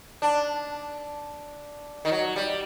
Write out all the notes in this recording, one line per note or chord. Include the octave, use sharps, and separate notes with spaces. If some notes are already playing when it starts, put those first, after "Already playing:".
D4
D#3
F#3
G3